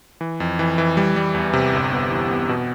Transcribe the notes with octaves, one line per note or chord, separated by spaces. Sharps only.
E3
F2
E3
E3
G3
G3
E2
C3
G1
B3
E3
B3
B2